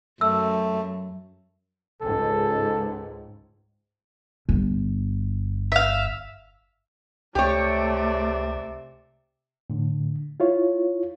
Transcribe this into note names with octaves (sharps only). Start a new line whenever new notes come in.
F#2 A3 E6
C#2 G#2 A4
G1
E5 F5
C#2 C3 A3 G4 C#5 D5
A2 D3
E4 F4 C#5